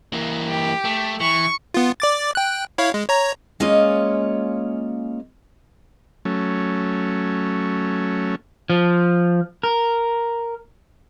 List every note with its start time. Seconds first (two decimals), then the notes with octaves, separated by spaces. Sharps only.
0.13 E3 A#3
0.49 G4
0.85 A3
1.21 E3 C#6
1.74 B3 F4
2.00 D5 D6 A6
2.35 G5 F#6
2.78 E4 C#5 F5
2.94 G#3
3.09 C#5 A#5
3.60 G#3 A#3 C#4 F4 C#5 D#5
6.25 F#3 A3 C#4
8.70 F3
9.63 A#4